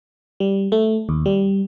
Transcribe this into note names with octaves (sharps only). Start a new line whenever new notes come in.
G3
A3
D#2
G3